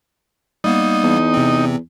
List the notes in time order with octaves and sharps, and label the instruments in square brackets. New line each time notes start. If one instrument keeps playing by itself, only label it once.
[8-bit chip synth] G3 A#3 B3 [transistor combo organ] D#4
[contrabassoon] E2
[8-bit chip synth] C3 C4